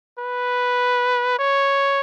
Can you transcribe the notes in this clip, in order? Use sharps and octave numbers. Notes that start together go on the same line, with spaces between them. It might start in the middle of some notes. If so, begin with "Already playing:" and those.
B4
C#5